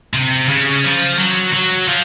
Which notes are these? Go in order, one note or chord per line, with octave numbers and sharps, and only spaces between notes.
C3
C#3
F3
F#3
F#3
F3